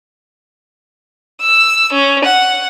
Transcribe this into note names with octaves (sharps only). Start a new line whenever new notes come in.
E6
C#4
F#5